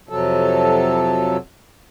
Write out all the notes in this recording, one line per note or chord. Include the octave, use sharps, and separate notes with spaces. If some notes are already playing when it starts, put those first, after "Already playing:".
F2 C3 F#3 A4